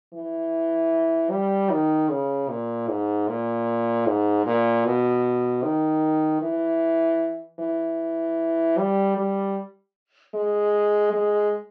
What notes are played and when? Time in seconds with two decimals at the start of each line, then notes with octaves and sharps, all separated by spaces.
0.14 E3
1.31 G3
1.71 D#3
2.10 C#3
2.49 A#2
2.89 G#2
3.28 A#2
4.07 G#2
4.46 A#2
4.86 B2
5.63 D#3
6.42 E3
7.60 E3
8.78 G3
9.18 G3
10.35 G#3
11.13 G#3